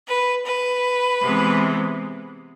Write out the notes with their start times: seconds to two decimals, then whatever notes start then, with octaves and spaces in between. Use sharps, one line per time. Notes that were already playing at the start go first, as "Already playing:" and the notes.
0.08 B4
0.47 B4
1.21 C3 E3 G#3 B3